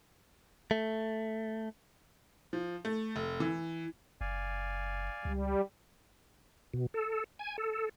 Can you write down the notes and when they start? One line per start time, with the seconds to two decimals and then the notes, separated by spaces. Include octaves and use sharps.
0.71 A3
2.53 F3
2.85 A3
3.16 F1
3.40 E3
4.21 F#1 D5 F5 G#5
5.25 C#2 G3
6.74 B2
6.94 A4
7.39 G#5
7.58 A4